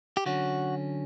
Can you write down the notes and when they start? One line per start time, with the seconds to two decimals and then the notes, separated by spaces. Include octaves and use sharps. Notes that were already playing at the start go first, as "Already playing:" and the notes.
0.17 G4
0.26 D3 F#3 C#4 F#4